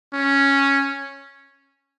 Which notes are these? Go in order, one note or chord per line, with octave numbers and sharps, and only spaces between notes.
C#4